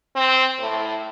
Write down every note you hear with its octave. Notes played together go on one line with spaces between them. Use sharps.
C4
A2